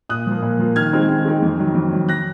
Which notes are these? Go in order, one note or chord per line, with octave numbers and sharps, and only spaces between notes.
A#2 D#6 F#6
F3 A#3
A#2
F3 A#3
D#3 F6 G#6
G#3 C4 D#4
D#3
G#3 C4 D#4
F2
D#3 F#3
F2
D#3 F#3
F#6 A#6